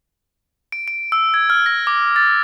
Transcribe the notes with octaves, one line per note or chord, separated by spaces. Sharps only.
D7
D7
E6
G#6
F6
A#6
D6
A6